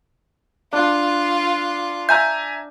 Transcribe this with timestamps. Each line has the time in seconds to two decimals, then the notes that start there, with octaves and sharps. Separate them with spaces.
0.73 D4 F4
2.09 E5 G#5 A#5 G6